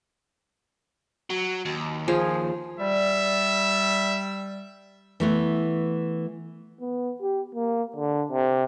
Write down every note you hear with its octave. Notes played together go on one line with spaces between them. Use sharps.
F#3
D#2
F3 G#4
G3 E5
E3 A3 B3
B3
G4
A#3
D3
C3